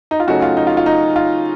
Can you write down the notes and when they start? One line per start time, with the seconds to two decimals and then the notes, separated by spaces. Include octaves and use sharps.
0.11 D#4
0.20 F4
0.27 C#3 F#3 A3 C#4 D#4 F#4
0.42 F4
0.57 D#4
0.67 F4
0.77 F4
0.86 D#4
1.16 F4